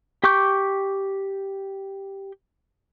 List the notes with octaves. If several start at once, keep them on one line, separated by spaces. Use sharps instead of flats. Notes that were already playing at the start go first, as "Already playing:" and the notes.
G4 G5 C#6 D6 G6